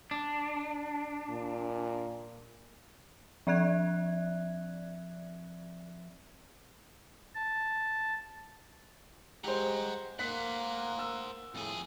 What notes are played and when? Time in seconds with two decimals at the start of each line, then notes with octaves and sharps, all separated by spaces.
0.11 D4
1.30 A#2
3.47 F3 C4 D5 E5 F#6 G#6
7.35 A5
9.44 G#3 G4 C5 F#5 A#5
10.19 A#3 C5 F#5 F#6 B6
10.99 E6
11.55 F2 A2 G#4